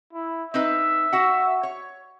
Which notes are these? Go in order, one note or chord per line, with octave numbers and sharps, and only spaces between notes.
E4
C4 D#4 B4 E5
F#4 F#5
C#5